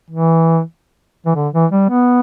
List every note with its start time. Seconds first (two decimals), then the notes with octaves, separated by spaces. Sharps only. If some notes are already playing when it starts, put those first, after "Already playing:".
0.10 E3
1.26 E3
1.36 D3
1.53 E3
1.72 G3
1.90 B3